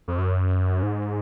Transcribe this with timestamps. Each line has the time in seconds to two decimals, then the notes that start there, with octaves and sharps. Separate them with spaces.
0.08 F2
0.18 F#2
0.83 G#2